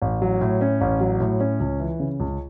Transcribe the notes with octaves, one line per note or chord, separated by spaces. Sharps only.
A1
F#3
A2
C#4
A1
F#3
A2
C#4
C#2
E3
C#3
C#2